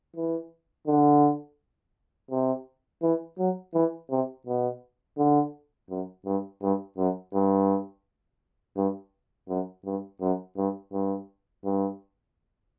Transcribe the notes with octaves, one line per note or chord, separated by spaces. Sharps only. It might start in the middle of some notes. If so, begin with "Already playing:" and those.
E3
D3
C3
E3
F#3
E3
C3
B2
D3
F#2
G2
G2
F#2
G2
G2
F#2
G2
F#2
G2
G2
G2